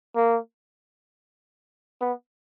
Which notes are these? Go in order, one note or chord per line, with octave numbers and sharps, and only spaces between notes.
A#3
B3